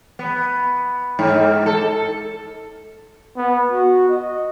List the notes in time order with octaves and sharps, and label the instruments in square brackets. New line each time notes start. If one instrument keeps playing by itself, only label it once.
[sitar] B3
G#2
A4
[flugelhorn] B3
F#4
D#5